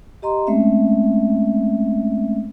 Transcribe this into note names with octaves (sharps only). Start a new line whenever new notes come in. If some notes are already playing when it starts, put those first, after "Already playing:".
G4 D#5 A#5 C6
G#3 A3 C4 C#4 E5